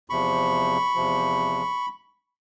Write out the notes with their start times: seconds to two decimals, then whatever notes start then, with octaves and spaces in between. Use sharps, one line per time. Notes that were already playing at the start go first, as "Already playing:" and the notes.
0.10 E2 C3 F3 B5 C#6
0.95 E2 C3 F3